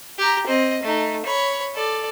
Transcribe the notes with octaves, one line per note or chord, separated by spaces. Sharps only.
G4 A#5
C4 D#5
A3 D#4
C#5 B5
A4 D5